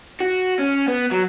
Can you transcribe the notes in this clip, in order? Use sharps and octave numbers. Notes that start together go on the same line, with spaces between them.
F#4
C#4
B3
F#3